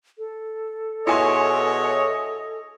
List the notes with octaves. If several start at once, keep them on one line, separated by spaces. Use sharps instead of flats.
A4
B2 E4 G#4 C#5 D#5 G#5 C6